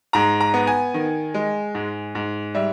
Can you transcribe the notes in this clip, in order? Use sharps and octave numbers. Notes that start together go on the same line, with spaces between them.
G#2 A#5
A#5
B3
G#5
D#3
G#3
G#2
G#2
G3 E5